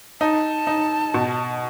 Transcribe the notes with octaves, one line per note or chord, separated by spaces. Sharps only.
D#4 A5
D#4
B2